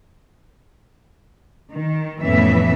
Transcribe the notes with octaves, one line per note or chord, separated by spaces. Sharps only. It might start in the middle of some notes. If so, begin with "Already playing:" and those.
D#3
F2 A2 E3 B3 C#4 E5